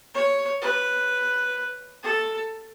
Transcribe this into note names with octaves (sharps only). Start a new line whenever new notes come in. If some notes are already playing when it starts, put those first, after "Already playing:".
C#5
B4
A4